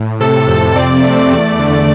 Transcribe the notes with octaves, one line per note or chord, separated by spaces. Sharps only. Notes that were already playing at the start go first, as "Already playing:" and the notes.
Already playing: A2
C3 A4
F2 A4
C4 D5
A3
E2 D5
D3